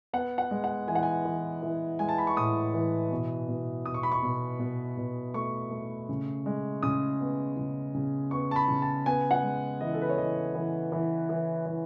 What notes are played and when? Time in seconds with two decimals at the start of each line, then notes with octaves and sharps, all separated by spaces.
0.13 B3 F#5
0.38 F#5
0.51 G#3
0.64 F#5
0.88 E3 G#5
0.95 F#5
1.03 G#5
1.25 E3
1.63 E3
1.99 G#3 G#5
2.08 A5
2.18 B5
2.27 C#6
2.37 A2 D#6
2.74 E3
3.11 B2
3.48 B2
3.86 B2 D#6
3.94 C#6
4.03 B5
4.12 C#6
4.22 B2
4.59 B2
4.97 B2
5.34 A3 C#6
5.71 A3
6.09 C#3
6.46 G#3
6.83 C#3 D#6
7.21 B3
7.57 C#3
7.94 C#3
8.31 B3 C#6
8.51 A5
8.56 B5
8.68 C#3
8.82 A5
9.06 B3 G#5
9.31 F#5
9.43 G#3
9.80 E3 D#5
9.93 A4
10.02 B4
10.09 C#5
10.18 E3 D#5
10.55 E3
10.92 E3
11.29 E3
11.66 E3